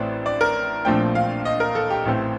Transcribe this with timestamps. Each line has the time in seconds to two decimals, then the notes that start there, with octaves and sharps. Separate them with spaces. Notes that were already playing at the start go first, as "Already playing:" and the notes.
Already playing: A1 A2 A3 C4 D5
0.26 D5
0.41 A#4
0.85 A#1 A#2 F3 A3 C4 G5
1.15 F5
1.45 D#5
1.60 A#4
1.75 A4
1.90 G4
2.05 A1 A2 A3 C4